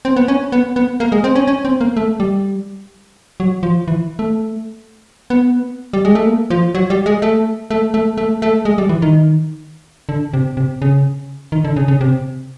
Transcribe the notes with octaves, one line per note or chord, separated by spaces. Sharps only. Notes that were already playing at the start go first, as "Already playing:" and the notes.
C4
B3
C#4
B3
B3
A#3
G#3
C4
C#4
C#4
C4
A#3
A3
G3
F#3
F3
E3
A3
B3
G3
G#3
A3
A#3
F3
F#3
G3
G#3
A3
A3
A3
A3
A3
G#3
G3
E3
D#3
D3
C3
C3
C#3
D#3
D3
C#3
C#3
C3